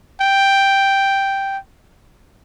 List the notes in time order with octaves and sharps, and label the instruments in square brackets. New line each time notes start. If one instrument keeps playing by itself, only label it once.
[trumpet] G5